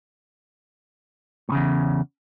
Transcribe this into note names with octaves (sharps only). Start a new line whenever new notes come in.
E2 A2 C#3